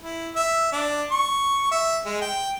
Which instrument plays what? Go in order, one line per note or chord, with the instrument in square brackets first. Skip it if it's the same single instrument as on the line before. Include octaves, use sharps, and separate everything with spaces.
[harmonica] E4
E5
D4
C#6
E5
G#3
G5